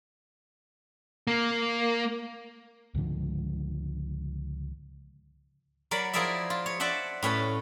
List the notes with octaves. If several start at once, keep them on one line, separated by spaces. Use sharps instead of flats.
A#3
C#2 G#2 D3 F3
F#3 A#4 D5 B5
F3 E4 G#4 A#4 D5 E5
F4
C#5
C5 D5 E5 F#5 A5
A2 C#4 B4 A5